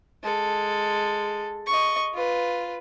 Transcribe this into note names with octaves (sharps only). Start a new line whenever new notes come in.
G#3 A4
D#5 C#6
F4 B4